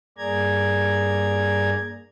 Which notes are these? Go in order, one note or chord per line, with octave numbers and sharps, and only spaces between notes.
G2 A#3 G#4 D5 A#5 G#6